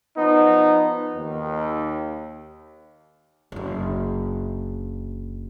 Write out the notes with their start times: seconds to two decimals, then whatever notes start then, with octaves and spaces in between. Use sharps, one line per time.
0.18 F3 B3 D#4
1.15 D#2
3.52 F#1 D3